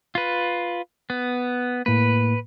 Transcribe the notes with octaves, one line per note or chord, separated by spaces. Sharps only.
F4 B4
B3
A2 A#3 B4